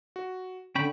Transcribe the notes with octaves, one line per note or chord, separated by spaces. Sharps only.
F#4
D3 C#4 G5 B5 C#6